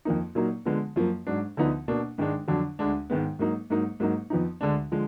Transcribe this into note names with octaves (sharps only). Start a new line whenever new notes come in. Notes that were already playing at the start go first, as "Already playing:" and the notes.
F2 F3 A#3 D#4
A#2 F#3 A#3 D#4
D3 F3 G#3 B3
F#2 F3 A#3
G#2 F#3 D4
D2 D3 F3 B3 D#4
B2 A#3 D4
G#2 D#3 G#3 D4
F2 D3 F#3 D4
D2 D3 G#3 D4
G#2 D#3 G#3 B3
G#2 F#3 A#3 D#4
G#2 F#3 A#3 D#4
G#2 F#3 A#3 D#4
F2 F3 B3 D#4
D2 D3 G#3 D4
D3 F3 G#3